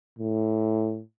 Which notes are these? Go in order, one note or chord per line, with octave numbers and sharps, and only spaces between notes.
A2